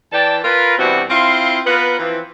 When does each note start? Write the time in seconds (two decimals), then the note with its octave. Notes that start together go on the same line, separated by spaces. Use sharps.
0.13 E3 D5 G5 A5
0.44 F4 A#4 B4
0.78 B2 E3 G3 C4 D4 F#4
1.10 C4 E4 F4 F5 C6
1.66 B3 F4 A#4 B4
1.99 E3 F3 C4